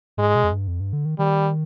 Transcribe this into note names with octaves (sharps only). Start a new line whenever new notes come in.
G#2 G#3
B2
F2
G2
F2
G2
D3
D#3
D#3 G3